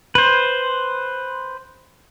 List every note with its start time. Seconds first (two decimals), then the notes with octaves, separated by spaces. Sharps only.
0.15 B4 C5